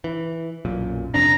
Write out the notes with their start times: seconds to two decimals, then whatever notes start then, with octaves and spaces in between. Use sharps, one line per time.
0.04 E3
0.65 B1 F#2 A#2
1.14 F2 C3 D4 A#5